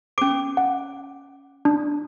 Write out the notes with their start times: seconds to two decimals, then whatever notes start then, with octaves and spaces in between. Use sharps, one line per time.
0.18 C#4 D6 D7
0.57 F#5
1.65 D4